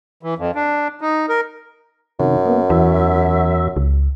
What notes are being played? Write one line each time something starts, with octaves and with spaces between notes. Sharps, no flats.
E3
F2
D4
D#4
A#4
F#2 C3 D#3
A#3 B3
E2 E3 F#4 E5
C#2